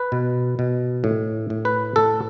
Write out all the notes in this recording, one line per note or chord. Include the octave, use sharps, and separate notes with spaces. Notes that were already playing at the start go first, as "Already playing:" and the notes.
Already playing: B4
B2
B2
A2
A2
B4
A2 A4